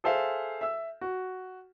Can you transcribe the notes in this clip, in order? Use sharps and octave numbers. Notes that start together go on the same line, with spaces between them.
G#4 A4 C5 E5 F5
E5 E6
F#4